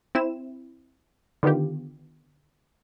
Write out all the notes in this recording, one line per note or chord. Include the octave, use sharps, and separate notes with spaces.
C4 E4 E7
D3 D#3 B3 F4 G4